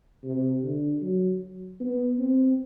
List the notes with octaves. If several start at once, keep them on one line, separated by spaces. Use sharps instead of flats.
C3
D3
F#3
B3
C4